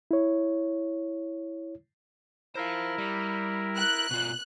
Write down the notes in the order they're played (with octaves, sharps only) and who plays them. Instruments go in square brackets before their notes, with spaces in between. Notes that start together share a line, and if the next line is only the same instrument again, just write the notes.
[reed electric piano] E4 C#5
[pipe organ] E4 A#4 [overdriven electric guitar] C5 F5
[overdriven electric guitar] G3
[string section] F#6
[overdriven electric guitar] B2 F4